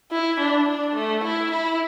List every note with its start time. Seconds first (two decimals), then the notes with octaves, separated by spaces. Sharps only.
0.12 E4
0.40 D4
0.68 D4
0.95 A3
1.23 E4
1.51 E4